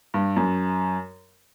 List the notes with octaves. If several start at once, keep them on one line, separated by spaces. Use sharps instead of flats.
G2
F#2